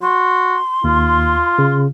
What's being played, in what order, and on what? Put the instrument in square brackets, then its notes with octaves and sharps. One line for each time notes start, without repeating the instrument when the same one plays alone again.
[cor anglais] F#4 [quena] C6
[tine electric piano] D#2 [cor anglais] F4
[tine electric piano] C#3